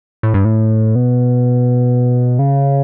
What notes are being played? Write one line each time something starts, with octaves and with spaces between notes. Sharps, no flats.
A2
G2
A2
B2
C#3